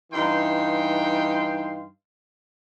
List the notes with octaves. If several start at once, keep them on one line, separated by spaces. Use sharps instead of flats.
G2 E3 D#4 F5 G5 C6